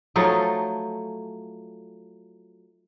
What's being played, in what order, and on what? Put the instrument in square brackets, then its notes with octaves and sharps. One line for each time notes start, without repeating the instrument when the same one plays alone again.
[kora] F3 F#3 A3 D#4